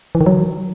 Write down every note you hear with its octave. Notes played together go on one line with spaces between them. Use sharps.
E3
D#3
F#3